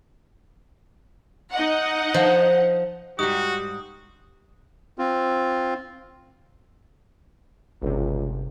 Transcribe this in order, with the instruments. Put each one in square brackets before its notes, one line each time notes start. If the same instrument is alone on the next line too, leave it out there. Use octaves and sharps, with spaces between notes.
[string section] D#4 D#5 F#5
[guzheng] F3
[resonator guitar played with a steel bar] G#2 G3 [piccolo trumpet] F#4 [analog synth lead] G4 [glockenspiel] D#6
[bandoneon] C4 F4
[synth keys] G1 C3 [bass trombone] C#2